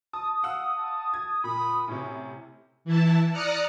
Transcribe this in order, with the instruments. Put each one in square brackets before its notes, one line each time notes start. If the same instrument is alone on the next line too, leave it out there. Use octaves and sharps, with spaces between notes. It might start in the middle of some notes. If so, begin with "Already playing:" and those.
[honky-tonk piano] A5 [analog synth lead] D#6
[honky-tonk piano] F5 F#5 E6
[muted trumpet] A5
[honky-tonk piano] G#6
[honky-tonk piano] A#2 [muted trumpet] B5
[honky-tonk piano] A2 C3 [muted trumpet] C#4
[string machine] E3 E4 A5
D5 A#5 D#6 F6 F#6 C#7